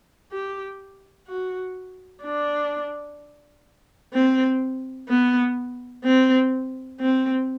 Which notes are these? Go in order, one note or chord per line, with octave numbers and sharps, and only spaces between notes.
G4
F#4
D4
C4
B3
C4
C4